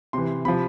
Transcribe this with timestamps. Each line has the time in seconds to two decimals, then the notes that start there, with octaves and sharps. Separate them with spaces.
0.13 C3 E3 C6
0.45 C3 F3 B5